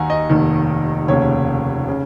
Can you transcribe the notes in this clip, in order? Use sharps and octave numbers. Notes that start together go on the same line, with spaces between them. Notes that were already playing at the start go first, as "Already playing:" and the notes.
Already playing: D#2 D#3 F#5 G#5 A#5
D#5
F1 D#2 D#3
F1 D#2 C#3 C#5
C#3